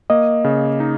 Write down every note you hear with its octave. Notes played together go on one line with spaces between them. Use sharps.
A#3 D#5
C#3
D#4